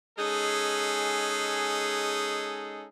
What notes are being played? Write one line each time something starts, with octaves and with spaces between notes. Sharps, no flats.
G#3 C#4 D#4 G#4 A4